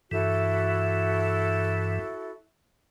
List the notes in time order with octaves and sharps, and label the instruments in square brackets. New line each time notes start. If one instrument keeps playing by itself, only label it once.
[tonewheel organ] G2 E3 [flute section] E4 F#4 A4